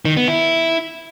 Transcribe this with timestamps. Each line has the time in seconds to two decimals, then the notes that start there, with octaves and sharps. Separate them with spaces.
0.05 D#3
0.17 B3
0.28 E4